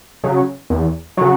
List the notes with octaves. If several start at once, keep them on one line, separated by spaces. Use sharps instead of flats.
C#3 F#3
E2
C#3 F#3